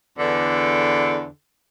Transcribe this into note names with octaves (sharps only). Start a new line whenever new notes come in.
E2 D3